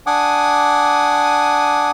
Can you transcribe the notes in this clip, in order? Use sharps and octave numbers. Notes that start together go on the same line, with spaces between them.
D4 F#5 G#5 D6 D#6